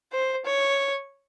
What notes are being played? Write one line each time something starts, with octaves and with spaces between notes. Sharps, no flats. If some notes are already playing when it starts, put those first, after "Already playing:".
C5
C#5